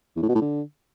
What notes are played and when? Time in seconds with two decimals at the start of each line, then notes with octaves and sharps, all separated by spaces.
0.16 E2
0.22 A2
0.29 B2
0.35 A2
0.41 D3